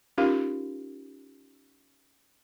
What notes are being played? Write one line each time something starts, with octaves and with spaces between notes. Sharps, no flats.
C#4 D#4 F4 G4 A#4 F5